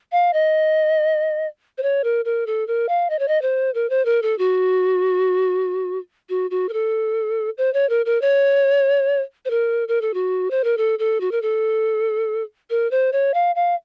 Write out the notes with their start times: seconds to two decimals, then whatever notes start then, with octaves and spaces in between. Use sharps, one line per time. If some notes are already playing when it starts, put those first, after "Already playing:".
0.12 F5
0.33 D#5
1.78 C5
1.83 C#5
2.04 A#4
2.25 A#4
2.47 A4
2.68 A#4
2.89 F5
3.10 D#5
3.19 C#5
3.28 D#5
3.42 C5
3.75 A#4
3.90 C5
4.05 A#4
4.23 A4
4.38 F#4
6.29 F#4
6.51 F#4
6.69 A#4
6.73 A4
7.58 C5
7.74 C#5
7.89 A#4
8.06 A#4
8.22 C#5
9.45 C5
9.50 A#4
9.88 A#4
10.02 A4
10.14 F#4
10.51 C5
10.64 A#4
10.77 A4
10.99 A4
11.21 F#4
11.32 A#4
11.42 A4
12.70 A#4
12.91 C5
13.13 C#5
13.34 F5
13.55 F5